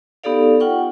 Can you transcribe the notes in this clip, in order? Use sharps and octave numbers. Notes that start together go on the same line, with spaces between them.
B3 D#4 G4 A4 D5 F5
F4 F#5 G5 C#6